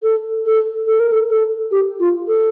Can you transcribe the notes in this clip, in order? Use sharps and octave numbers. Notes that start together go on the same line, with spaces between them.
A4
A4
A4
A#4
A4
A4
G4
F4
A4